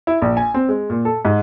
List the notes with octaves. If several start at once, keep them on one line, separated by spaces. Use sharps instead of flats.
E4
A#1
G#5
C4
G#3
A#2
A4
G#2